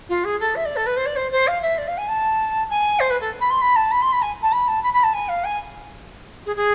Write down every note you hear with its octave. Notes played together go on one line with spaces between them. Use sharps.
F4
G#4
A4
E5
D5
A4
B4
C5
D5
C5
C5
F5
E5
D5
F5
G#5
A5
G#5
C5
B4
A4
B5
C6
B5
A5
B5
C6
B5
G#5
A5
B5
A5
B5
B5
A5
G#5
F5
G#5
G#4
G#4